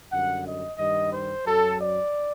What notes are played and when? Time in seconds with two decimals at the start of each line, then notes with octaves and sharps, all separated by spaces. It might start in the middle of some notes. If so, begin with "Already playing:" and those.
0.11 F#2 D3 G3 F#5
0.45 D#5
0.78 G2 D#3 G3 D#5
1.12 C5
1.46 F#2 F#3 A4
1.80 D5